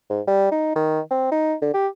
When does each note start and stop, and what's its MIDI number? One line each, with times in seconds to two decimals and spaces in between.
0.10 0.21 44
0.27 0.52 55
0.52 0.72 63
0.76 1.00 51
1.11 1.29 60
1.32 1.54 63
1.62 1.70 50
1.74 1.87 67